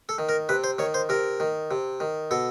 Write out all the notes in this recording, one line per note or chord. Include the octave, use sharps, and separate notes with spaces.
A4
D#3
A#4
C3 B4
C5
D#3 C#5
C5
C3 A#4
D#3
C3
D#3
B2 A4